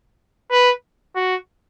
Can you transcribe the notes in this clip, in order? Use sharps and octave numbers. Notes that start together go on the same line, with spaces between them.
B4
F#4